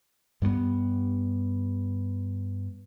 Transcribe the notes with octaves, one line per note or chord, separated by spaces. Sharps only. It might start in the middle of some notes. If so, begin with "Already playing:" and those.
G2 G3 A3 B3